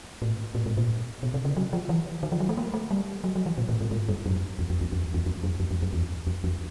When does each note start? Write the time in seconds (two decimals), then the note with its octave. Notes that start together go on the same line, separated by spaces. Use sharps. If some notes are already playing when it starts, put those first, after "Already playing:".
0.22 A2
0.55 A2
0.66 G#2
0.77 A#2
1.23 B2
1.34 C3
1.45 C#3
1.57 F#3
1.73 F3
1.89 E3
2.23 D#3
2.32 F3
2.40 F#3
2.49 A3
2.57 A#3
2.74 A3
2.91 G3
3.24 F#3
3.36 F#3
3.46 E3
3.58 A#2
3.69 A2
3.81 G#2
3.91 G#2
4.09 G2
4.26 F#2
4.59 E2
4.70 F2
4.81 E2
4.92 F2
5.14 E2
5.26 F2
5.43 F#2
5.60 F2
5.71 F2
5.82 F#2
5.93 E2
6.27 F2
6.44 F2